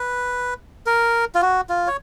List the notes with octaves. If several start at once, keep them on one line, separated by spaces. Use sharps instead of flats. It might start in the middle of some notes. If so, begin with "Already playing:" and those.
Already playing: B4
A#4
F4
F#4
F4
C#5